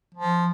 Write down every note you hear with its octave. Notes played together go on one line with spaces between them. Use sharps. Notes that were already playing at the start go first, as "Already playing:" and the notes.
F3